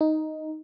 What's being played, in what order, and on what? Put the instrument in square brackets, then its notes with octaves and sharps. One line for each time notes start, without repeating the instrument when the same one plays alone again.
[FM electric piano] D#4